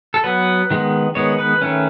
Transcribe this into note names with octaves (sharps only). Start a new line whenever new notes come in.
A4
F#3 B3 B4
D#3 G#3 B3
D#3 G#3 B3 C#5
B4
D#3 A3 C#4